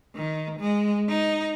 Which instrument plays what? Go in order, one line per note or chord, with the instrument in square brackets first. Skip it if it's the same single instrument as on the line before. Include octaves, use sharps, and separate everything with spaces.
[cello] D#3
G#3
D#4